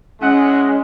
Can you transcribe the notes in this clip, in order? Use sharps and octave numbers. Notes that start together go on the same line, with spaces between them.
E3 G#3 C#4 F#5